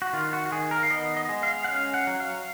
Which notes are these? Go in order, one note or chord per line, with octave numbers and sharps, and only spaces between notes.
F#4
D#3 F4
F#4
F#4
D#3 G#4
A#4
F5
B3 D#5
D#5
G#3
F5
F#5
C#4 F5
F#5
F#3
F5